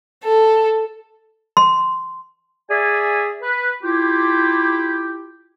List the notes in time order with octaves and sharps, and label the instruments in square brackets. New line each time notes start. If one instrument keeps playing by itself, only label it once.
[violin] A4
[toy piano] C6
[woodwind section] G#4 D5 E5 G#5
B4
E4 F4 G4